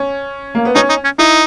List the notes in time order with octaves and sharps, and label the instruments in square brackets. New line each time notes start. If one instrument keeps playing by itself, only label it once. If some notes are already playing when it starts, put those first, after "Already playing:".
Already playing: [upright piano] C#4
A#3
B3
[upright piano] C#4 [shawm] D#4
[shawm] D#4
C#4
[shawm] D#4 [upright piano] E4